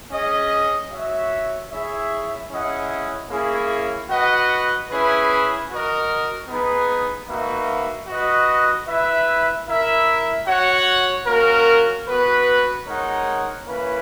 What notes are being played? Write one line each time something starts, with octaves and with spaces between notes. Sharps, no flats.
C#4 G#4 D#5
F#4 C#5 E5
E4 G#4 C#5 E5
C#4 E4 G#4 D#5 F#5
A#3 C#4 E4 G#4
F#4 B4 D#5 F#5
C#4 E4 G#4 B4
F#4 A#4 D#5
B3 D#4 G#4 B4
A#3 D#4 F#4 B4 E5
F#4 B4 D#5 F#5
E4 B4 E5
E4 A#4 E5
F#4 C#5 F#5
A#3 C#4 F#4 A#4
B3 F#4 B4
G#3 D#4 A#4 C#5 F#5
A#3 C#4 E4 B4